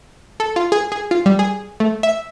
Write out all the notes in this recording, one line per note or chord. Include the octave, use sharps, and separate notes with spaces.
A4
F4
G#4
G#4
F4
G3
G#4
A3
E5